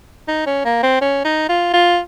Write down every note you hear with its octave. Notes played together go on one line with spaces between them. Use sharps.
D#4
C#4
A#3
C4
C#4
D#4
F4
F4